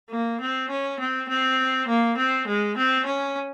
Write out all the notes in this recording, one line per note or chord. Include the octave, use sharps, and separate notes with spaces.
A#3
C4
C#4
C4
C4
A#3
C4
G#3
C4
C#4